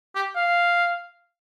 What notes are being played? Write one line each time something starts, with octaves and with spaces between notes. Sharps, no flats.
G4
F5